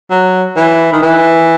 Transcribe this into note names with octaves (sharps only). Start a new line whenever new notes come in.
F#3
E3
D#3
E3